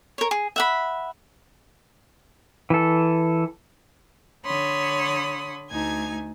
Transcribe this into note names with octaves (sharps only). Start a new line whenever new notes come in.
A#4 C#5
G#4
E5 F#5 B5
E3 A4
D3 C#5 B5 C6 D#6
D2 A3 D#4 G#5 G#6